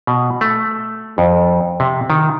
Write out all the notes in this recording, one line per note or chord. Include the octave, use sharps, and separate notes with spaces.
B2
A3
F2
C3
D#3